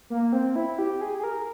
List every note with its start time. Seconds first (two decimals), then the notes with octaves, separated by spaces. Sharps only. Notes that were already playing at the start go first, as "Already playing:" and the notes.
0.10 A#3
0.33 C4
0.56 E4
0.79 G4
1.01 G#4
1.18 G#4
1.24 A#4